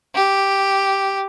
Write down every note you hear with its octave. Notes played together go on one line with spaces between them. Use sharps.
G4